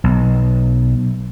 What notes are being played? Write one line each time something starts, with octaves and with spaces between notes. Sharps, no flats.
B1